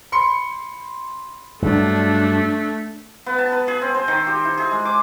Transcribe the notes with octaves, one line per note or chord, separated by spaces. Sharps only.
B5 C6 C#7
G2 F#3 A3 D4
B3
A5
B4
G#4
C4
C5
D#3
G4
E4
G#4
G#3
D6